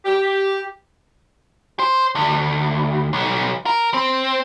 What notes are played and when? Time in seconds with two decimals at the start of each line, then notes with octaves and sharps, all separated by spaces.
0.05 G4
1.79 C5
2.15 D2
3.13 B1
3.66 A#4
3.94 C4